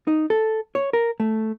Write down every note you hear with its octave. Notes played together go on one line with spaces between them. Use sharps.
D#4
A4
C#5
A#4
A3